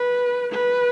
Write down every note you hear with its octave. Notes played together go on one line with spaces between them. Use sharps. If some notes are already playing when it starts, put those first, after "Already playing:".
Already playing: B4
B4